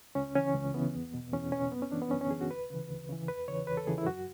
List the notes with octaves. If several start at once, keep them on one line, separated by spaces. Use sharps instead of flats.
C#2 C#4
C#3 E3 C#4
C#2
C#3 E3 B3
E2
B2
E2 C#4
B2 C#4
F#2 B3
C#4
E3 D4
B3
F#2 C#4
C#4
E3 G#4
F#4
D2 B4
C#3 E3
D2
C#3 E3
E2 B4
C#3 E3 C#5
E2 B4
A4
C#3 E3 G#4
E4
F#2 F#4